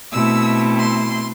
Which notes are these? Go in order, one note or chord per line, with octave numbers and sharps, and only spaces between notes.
B2 A3 C4 E4 E6
C6